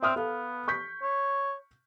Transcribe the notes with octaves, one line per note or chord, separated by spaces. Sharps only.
C4 E5 D#6 F6
B3 A4 F5
C#6 G6 B6
C#5